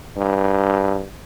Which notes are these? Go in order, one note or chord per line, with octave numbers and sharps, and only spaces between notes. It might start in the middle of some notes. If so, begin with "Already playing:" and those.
G2